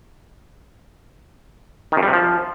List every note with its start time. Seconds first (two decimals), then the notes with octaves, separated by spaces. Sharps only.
1.92 D#3
1.97 F#2
2.03 G3
2.08 C3
2.13 F3